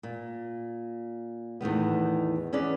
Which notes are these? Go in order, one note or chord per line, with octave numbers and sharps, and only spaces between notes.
A#2
E2 A2 D#3 B3
E2 C#4 G#4 B4 D5